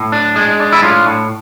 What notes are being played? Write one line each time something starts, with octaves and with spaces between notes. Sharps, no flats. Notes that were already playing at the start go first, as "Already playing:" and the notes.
Already playing: A2
D4
G#3
D4
E4
A2 F4
A2